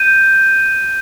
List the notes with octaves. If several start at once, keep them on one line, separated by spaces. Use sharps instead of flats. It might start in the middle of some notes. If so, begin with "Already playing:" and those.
Already playing: G6 D#7